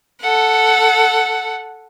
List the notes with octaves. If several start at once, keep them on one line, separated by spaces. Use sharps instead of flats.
A4 F#5